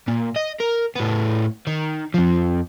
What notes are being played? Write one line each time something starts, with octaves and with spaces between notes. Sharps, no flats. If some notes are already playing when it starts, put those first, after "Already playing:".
A#2
D#5
A#4
A2 B3
D#3
F2 F3